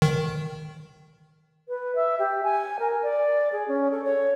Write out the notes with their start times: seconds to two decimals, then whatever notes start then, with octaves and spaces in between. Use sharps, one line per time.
0.02 D#3
1.68 B4
1.95 E5
2.19 G4
2.43 G#5
2.79 A#4
3.03 D5
3.52 G#4
3.68 C#4
3.91 A4
4.04 C#5